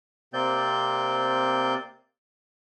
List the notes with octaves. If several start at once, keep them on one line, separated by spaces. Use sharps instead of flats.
C3 A#3 C4 D5 G6